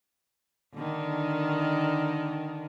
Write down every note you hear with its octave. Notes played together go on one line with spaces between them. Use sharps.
D3 D#3